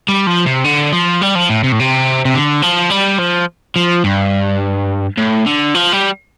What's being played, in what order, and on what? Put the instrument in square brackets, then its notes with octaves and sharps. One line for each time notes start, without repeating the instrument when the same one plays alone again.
[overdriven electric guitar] G3
F3
C3
D3
F3
G3
F3
A2
C3
A2
C3
C3
D3
F3
G3
F3
F3
G2
A2
D3
F3
G3